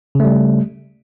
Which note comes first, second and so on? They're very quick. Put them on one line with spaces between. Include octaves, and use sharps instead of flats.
C#3 A3 G3